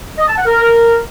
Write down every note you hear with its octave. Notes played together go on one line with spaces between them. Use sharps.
D#5
A5
F#5
A#4